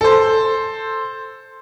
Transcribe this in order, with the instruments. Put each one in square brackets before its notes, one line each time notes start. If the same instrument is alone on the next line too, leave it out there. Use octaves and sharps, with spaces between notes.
[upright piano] A4 C5